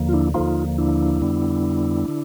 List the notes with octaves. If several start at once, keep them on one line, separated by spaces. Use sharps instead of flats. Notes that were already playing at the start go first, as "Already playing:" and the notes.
Already playing: D#2 D3 F3 A#3
F4
D4 E4
D#2 D3 F3 A#3 D#4 F4
D4 E4
F2 D3 G3 B3
D3